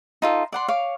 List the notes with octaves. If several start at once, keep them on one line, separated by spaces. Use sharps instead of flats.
D#4 F4 A4
D5 F#5 C6
C#5 F5 D6